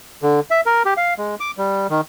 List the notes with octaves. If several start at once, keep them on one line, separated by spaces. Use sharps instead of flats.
D3
E5
A#4
G4
F5
G#3
D6
G3
D#3